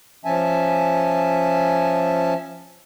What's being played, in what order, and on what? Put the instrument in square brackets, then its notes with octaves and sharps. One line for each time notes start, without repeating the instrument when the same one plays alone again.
[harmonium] F3 C#4 E5 G#5 A5